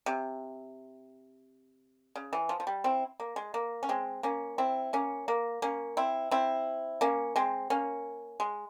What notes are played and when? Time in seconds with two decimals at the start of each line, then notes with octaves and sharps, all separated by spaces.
0.06 C3
2.16 C#3
2.33 E3
2.49 F3
2.60 F3
2.67 G3
2.84 C4 E4
3.20 A#3
3.36 G#3
3.54 A#3
3.83 C#4
3.89 G#3 C4
4.23 A#3 C#4
4.58 C4 E4
4.93 A#3 C#4
5.28 A#3
5.62 A#3 C#4
5.97 C4 E4
6.31 C4 E4
7.01 A#3 C#4
7.36 G#3 C4
7.70 A#3 C#4
8.40 G#3